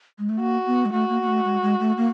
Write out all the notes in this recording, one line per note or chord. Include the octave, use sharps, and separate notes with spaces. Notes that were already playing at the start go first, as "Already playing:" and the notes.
G#3
A3
A#3 F#4
B3
G#3
A3 F#4
A#3
A#3
A3
G#3
G#3
A3
A#3